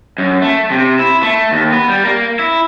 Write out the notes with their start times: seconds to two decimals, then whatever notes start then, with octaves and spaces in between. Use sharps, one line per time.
0.18 F#2
0.42 A3
0.71 C3
0.99 E4
1.23 A3
1.51 D#2
1.72 B3
1.88 G3
2.05 A#3
2.39 E4